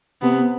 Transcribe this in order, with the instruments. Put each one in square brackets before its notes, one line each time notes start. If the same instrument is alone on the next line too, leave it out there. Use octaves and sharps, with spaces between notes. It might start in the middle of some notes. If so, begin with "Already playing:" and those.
[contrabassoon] C3 [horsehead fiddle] B3